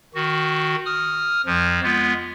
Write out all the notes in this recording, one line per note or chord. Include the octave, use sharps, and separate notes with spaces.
D#3 F#4
D#6 F6
F2 F3
G#3 B3 F4